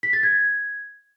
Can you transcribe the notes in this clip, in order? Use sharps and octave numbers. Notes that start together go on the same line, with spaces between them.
B6
A6
G#6